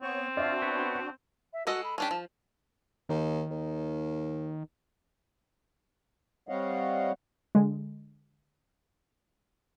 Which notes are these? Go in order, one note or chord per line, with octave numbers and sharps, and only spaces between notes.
B3 C4 C#5 C#6
D4 F4 F#4 D5 E5
B3 B4 C#5
E5
G#3 F#4 A4 D#5
B5
C#4 D4 G4 A5
F3
D#2 D#3
D#2
G3 C4 C#5 D#5 F5 F#5
D3 G#3